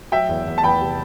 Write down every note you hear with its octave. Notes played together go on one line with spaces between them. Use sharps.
F#3 E5 G5
E2
E2
A5
E2 G5 B5
C3